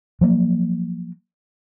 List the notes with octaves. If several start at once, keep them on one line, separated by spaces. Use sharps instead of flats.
F3 F#3 A#3